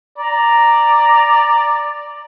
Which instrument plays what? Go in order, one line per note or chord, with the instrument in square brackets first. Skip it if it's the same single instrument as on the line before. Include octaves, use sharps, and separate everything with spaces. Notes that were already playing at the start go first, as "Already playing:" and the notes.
[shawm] D5 [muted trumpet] A#5